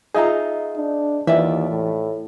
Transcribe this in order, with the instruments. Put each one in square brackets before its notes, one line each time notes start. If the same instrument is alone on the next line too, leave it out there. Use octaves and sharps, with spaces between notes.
[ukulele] D#4 F4 A#5 [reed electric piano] G#4 D#5 E5
[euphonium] D4
[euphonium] D#2 [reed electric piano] E3 [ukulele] F4 D5 E5
[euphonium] A2